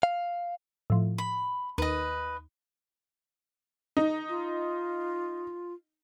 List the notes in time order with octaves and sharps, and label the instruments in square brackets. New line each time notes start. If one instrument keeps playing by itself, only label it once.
[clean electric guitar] F5
[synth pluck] A2 F3
[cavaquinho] B5
[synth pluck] D#2 [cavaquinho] B4 D#5
[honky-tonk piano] D#4
[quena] F4